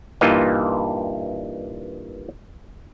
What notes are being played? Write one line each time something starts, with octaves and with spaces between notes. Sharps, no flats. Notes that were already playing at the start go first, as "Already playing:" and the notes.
G2 A#2 E3 A#3 D#4 F4